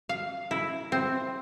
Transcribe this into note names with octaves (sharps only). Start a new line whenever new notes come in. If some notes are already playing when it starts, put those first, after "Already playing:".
F5
E4
C4